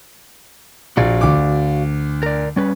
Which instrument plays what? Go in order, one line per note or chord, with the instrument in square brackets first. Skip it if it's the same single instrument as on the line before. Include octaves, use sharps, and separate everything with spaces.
[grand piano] A#1 [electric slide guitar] F#4 D5 F5
[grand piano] D2 D6
[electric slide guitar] A#4 D5
G3 C#4 B4